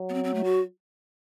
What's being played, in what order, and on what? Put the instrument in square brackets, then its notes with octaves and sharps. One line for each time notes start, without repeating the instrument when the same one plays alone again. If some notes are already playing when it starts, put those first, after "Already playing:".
Already playing: [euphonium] F#3
[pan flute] B3
C4
C4
A3
F#4